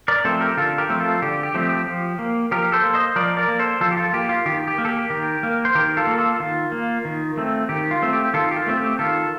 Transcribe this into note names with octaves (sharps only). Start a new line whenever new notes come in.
A#4 D5
F3 A3 C4 A4 C5
G4 A#4
D3 F4 A4
G4 A#4
F3 A3 C4
F4 A4
D3 G4
G4
F3 A3 C4
G4
F3
A#3
F3 G4 A#4
A4 C5
A#3
C5 D#5
F3 A#4 D5
A#4 D5
A#3
A4 C5
F3 F4 A4
G4
F4 A4
A#3 G4
F4
D#3 G4
G4
A#3
A4
G4
D#3 G4 A#4
A#3
C5
D#3 G4 A#4
F4 A4
A#3
F4 A4
D#3 F4
A#3
D#3
A3 C4
D#3 G4
F4
A3 C4
G4
D#3 F4 A4
G4
F4
A3 C4
G4
D#3 F4 A4